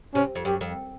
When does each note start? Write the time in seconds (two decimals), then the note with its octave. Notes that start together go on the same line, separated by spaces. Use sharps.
0.14 C3 C#4
0.35 F2
0.45 F#2 G4
0.61 F2